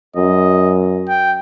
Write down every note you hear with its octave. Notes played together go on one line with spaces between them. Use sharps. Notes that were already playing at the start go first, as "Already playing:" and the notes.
F#2 D#5
G5